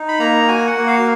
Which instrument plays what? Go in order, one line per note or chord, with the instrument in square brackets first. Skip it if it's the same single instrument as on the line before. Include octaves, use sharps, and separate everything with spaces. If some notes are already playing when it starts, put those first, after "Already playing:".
Already playing: [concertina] D#4
B5
A#3 A#5
F#4 G#5
F#5
A#3
F5